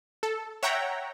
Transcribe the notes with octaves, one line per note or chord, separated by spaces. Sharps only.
A4
C#5 E5 F#5 G5 A#5